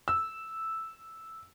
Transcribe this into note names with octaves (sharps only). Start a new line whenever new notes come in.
E6